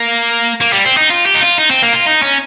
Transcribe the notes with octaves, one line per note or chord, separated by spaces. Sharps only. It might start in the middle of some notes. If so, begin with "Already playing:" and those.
Already playing: A#3
A#3
G3
C4
D#4
F4
G4
D#4
F4
D#4
C4
A#3
F4
D#4
C#4